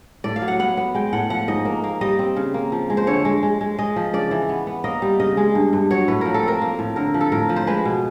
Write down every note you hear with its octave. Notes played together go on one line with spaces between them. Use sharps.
A2 D5
F5
F#3
F#5
B3 F#5
B3
G#3 G5
A2 F#5
F3 F#5
G#2 D#5
A#3
A#3
G3 D#5
C4
C#3
A#3
F3
G#3
C5
D3 C#5
G#3
G#3
G#3
G#3 D#5
F3
C#3 D5
E3
B3
B3
A#3 D#5
G3
C#3 D#5
G#3
G2
G2
F#3 C#5
A2 B4
F3 A#4
A4
C4 A#4
A#3
A2
D3 A#4
F3
A4
A2 A#4
F3
C5
G#3 B4
B2